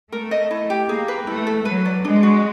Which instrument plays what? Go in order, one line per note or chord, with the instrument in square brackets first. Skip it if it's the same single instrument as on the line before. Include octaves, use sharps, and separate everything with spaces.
[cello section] A3 [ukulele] A#4
[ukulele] D#5
E4
G4
[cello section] A#3 [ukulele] G#4
[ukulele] B4
[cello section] A3 [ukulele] E4
[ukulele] A4
[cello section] F#3 [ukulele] B4
[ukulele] D5
[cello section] G#3 [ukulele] D4
[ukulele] F#4